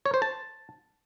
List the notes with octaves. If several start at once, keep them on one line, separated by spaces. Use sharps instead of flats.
C#5
C5
A5